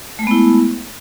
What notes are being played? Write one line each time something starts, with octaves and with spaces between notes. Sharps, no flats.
G#3 A3 B3 E4